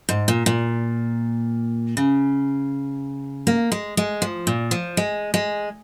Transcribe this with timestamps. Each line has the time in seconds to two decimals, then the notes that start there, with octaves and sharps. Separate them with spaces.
0.09 G#2
0.28 A#2
0.46 A#2
1.97 C#3
3.47 A#3
3.72 G#3
3.97 G#3
4.22 F3
4.47 A#2
4.71 F3
4.97 G#3
5.34 G#3